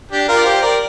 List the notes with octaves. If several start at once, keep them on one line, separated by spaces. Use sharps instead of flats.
D4 G4
F4 A#4
D5
G4 C5
A#4 D5